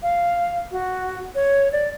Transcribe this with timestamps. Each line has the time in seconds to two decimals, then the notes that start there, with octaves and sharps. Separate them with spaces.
0.03 F5
0.71 F#4
1.35 C#5
1.72 D5